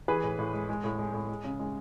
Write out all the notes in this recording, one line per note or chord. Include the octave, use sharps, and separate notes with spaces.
E3 G#4 B4
A2
A2
G#3
G#3
A2
G#3
A2
G#3
C#3
G#3